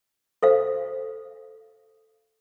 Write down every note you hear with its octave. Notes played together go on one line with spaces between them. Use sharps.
A4 C5 F5